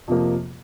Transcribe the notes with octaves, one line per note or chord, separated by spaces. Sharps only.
F2 C3 F3 A#3